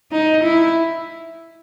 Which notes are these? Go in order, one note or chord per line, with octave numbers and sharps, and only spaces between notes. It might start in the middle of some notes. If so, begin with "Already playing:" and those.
D#4
E4